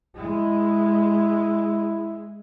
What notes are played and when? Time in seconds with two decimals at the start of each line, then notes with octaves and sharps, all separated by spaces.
0.19 G#3 E4